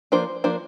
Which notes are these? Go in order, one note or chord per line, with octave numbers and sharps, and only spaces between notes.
F3 A#3 D4 C5
F3 A#3 D4 C5